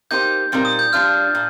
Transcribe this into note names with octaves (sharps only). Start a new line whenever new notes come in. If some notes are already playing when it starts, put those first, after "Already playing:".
A#3 D#4 G4 C5 G6
A#2 G3 C4 D#4 A#4
D#6
G6
G3 D4 F4 F6
A#2